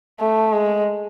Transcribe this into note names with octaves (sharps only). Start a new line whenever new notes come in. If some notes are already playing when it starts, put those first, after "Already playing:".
A3
G#3